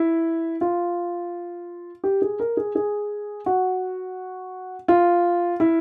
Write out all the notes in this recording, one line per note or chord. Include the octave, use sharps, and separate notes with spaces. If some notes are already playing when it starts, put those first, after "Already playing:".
Already playing: E4
F4
G4
G#4
A#4
G#4
G#4
F#4
F4
E4